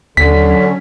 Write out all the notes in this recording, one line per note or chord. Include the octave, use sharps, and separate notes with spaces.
D#2 D3 F#3 C#4 B6